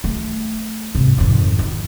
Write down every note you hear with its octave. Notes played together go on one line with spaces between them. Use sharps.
A3
G#2 C3
G#1 F2
D#3